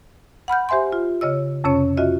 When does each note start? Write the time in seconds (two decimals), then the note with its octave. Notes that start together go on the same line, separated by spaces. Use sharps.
0.48 F#5 B5 F6 G6
0.69 G4 C5 E5 G#5 C6
0.92 F4
1.21 C#3 C#5 D#5 E6
1.64 F2 C3 C#4 C#5
1.97 F4 F#4 D#5 E5